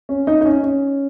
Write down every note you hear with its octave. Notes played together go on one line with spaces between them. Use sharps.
C#4
D#4
D#4
C#4
C#4